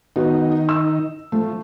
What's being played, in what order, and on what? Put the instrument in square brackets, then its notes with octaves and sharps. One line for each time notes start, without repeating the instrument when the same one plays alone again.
[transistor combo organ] D#3 D#4 [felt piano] B3 F#4
[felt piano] E6
[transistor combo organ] F3 [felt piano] A3